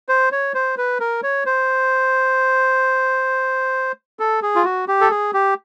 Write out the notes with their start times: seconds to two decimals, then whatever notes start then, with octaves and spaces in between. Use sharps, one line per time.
0.09 C5
0.32 C#5
0.55 C5
0.78 B4
1.00 A#4
1.23 C#5
1.46 C5
4.19 A4
4.42 G#4
4.56 F4
4.64 F#4
4.88 G4
5.01 A4
5.11 G#4
5.34 G4